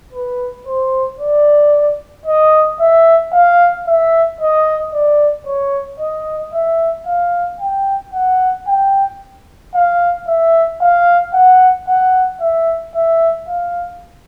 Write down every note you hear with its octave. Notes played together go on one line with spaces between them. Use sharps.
B4
C5
D5
D#5
E5
F5
E5
D#5
D5
C#5
D#5
E5
F5
G5
F#5
G5
F5
E5
F5
F#5
F#5
E5
E5
F5